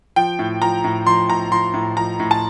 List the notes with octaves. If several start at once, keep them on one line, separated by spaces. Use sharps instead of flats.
F3 G5
A2
F3 A#5
A2
F3 C6
A2 A#5
F3 C6
A2
F3 A#5
A2
A5